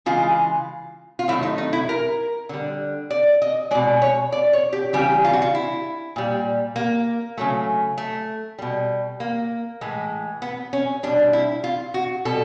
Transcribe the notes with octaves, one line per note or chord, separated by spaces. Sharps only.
C#3 E3 G#3 F4
F4
C3 D#3 F#3 A3 E4
D#4
D#4
E4
A#4
D3 G3
D5
D#5
B2 G#3 D5
C#5
D5
C#5
G4
C#3 E3 G3 G4
F4
F#4
F4
E4
A#2 G3
A#3
C#3 F#3 A3
A3
B2 G3
A#3
A2 E3 G#3
B3
C#4
B2 G3 D4
E4
F4
F#4
B2 G3 A4